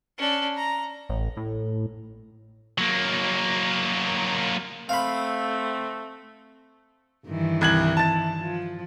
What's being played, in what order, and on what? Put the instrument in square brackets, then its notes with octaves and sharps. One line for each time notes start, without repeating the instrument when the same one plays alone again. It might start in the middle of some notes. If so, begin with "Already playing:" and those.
[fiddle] C#4 D4
A#5
[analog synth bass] A1
A2
[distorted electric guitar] F#3 A#3
[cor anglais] A3 [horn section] C4 [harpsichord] F5 B5
[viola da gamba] G2 D#3 E3
[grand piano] C2 G#6 F#7
A5 A6
[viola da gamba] F3